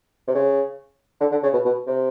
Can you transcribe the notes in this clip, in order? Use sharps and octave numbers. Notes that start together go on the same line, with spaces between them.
C3
C#3
D3
D3
C#3
B2
B2
C3